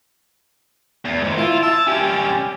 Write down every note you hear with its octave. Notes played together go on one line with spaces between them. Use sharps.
E2
G#2 D#3
E4 F4
E5 A5
G3 C#4 G4